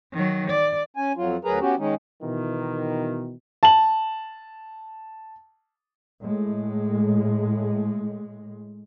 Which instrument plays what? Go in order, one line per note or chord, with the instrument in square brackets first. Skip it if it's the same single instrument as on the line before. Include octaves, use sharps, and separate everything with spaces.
[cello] D#3 F#3
D5
[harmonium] C#4 G#5
F2 F#3 F4
D2 F#3 G#4 A#4 B4 A#5
B3 C#4 F#4 G4
D#3 G#3 C#4 D#4
[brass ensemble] B2 D#3 E3
[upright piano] A5 F#7
[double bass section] A2 G#3